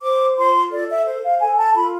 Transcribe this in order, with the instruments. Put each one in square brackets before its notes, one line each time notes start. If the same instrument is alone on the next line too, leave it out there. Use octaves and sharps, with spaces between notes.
[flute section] C5 D6
F4 C6
A4 D5
E5
C5
F5
A4 G#5
A5
F4 B5